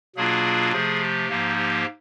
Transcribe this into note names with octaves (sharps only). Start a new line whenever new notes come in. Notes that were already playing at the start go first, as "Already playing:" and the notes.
B2 F#3 A#3 D4 F4 G#4
C3 F3 A3 G#4
G4
G#2 F3 A#3 D#4
G4